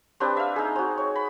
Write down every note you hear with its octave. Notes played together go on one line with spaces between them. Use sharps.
C4 D4 G4 B4
E5 F5
D#4 G#4
C4 F#4
C#5
B5